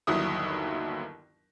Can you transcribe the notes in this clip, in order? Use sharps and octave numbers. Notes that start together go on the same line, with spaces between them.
G1 D#2 F#3 E4 D#6